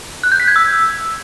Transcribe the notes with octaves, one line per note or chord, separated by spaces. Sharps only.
F#6
G6
B6
G#6
E6